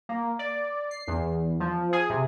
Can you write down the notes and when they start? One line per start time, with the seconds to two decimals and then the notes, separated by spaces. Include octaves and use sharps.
0.09 A#3
0.39 D5
0.91 C7
1.08 E2
1.60 F3
1.93 G#4
2.10 C3